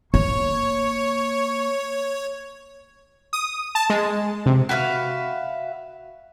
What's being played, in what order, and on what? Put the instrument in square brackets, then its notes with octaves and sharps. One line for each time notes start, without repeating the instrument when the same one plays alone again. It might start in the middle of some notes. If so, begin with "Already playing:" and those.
[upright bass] A#3 [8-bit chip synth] C#5 [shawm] C#6
[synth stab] D#6
A5
G#3
C3
[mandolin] F#4 B4 E5 F5